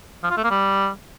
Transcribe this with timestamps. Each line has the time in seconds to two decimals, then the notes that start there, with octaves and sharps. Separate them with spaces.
0.23 F3
0.30 F4
0.37 A3
0.44 A#3
0.51 G3